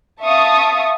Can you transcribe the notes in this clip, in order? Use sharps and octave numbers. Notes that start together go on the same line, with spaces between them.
E5 F5 A5 C#6 D#6